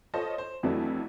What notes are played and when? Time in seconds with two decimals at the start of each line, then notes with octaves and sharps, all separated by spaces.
0.14 F4 A4 C5 C#5 D#5
0.38 C5
0.63 F2 E3 F#3 A3 D4 E4